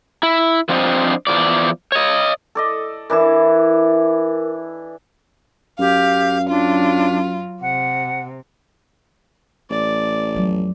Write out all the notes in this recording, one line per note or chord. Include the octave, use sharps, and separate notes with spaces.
E4
F3 C4 D4 C5 D5 D#5
E2 E3 F3 D5
C#5 D#5
A4 D5 D#5
E3 D4 E4 A#4 E5
F#2 G4 F5
F#3 D4 F4
C3 F#5
A1 D5
F2 F#3